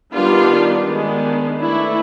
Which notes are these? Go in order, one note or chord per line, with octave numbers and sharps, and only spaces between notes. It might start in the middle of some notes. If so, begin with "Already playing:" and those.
D#3 G3 B3 D4 F4
D#3 G#3 B3 D4
E3 A3 D4 E4